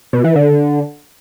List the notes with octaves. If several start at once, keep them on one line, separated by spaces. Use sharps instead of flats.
B2
E3
D3